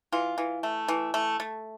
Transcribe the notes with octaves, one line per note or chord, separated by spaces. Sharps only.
E3 F4
E3
A3
E3
A3
A3